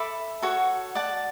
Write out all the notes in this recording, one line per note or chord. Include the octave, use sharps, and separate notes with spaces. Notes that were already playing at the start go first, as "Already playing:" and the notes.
Already playing: A4 E5 B5 D6
F#4 A4 C#5 F#5
D5 F#5 A5